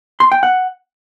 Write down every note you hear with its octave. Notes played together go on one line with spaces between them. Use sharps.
C6
G5
F#5